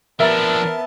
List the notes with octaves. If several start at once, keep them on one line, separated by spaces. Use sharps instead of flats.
F3 B3 D4 A#4 E5 A5 A#5 A6